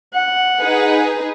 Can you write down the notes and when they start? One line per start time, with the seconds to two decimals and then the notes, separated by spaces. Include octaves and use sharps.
0.14 F#5
0.61 D#4 G#4 B4